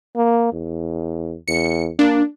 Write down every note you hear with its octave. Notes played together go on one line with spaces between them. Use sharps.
A#3
E2
E2 C#7
A#3 D4